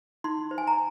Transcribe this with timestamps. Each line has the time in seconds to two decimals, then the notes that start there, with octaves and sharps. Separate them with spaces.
0.24 D#4 C6
0.51 C5
0.58 G#5
0.67 A#5